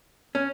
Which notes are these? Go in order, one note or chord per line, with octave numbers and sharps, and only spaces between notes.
C#4